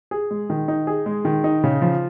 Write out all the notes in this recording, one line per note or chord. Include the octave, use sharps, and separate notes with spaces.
G#4
G#3
D#3
D#4
G#4
G#3
D#3
D#4
C#3
F3